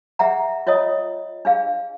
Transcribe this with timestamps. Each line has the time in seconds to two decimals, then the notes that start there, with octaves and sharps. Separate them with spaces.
0.19 G#4 E5 F#5 A#5
0.67 F4 C#5 D#5 D#6
1.45 D4 G#4 F5